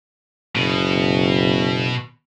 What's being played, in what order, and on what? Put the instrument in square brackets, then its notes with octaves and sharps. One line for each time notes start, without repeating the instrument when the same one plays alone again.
[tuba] F#1 [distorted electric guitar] B2